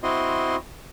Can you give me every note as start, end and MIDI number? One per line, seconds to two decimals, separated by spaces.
0.03 0.56 60
0.03 0.56 64
0.03 0.56 66
0.03 0.56 75
0.03 0.56 84